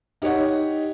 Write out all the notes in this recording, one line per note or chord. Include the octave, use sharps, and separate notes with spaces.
D#4 G4 C#5 D#5 F#5